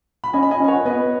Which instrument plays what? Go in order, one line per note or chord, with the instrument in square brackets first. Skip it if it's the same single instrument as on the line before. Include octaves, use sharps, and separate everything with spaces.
[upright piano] B5
[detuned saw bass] C#4 [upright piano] D#5 G#5
[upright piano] B5
D#5 G#5
[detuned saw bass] C#4
[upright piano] G#5
C#5 F#5
[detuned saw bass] B3 [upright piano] B4 D#5